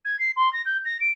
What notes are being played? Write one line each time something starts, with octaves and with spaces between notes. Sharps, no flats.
G#6
C7
C6
A#6
G6
A#6
D7